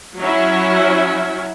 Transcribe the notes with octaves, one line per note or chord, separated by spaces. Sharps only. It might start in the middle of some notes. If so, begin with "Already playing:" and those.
F#3 C#4 E4